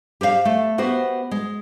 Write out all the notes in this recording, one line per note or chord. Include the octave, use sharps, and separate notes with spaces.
G4 C5 C#5 F5
A3
B3 F#4 G4 C5
G#3